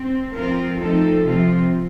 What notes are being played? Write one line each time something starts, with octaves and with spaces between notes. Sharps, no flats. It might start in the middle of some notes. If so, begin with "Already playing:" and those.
Already playing: C4
F3 C4 F4 A#4
F3 A3 C4 D#4 A4
C3 F3 C4 F4